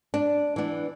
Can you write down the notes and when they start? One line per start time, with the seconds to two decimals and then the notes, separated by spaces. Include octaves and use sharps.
0.14 D4
0.56 E3 B3 D4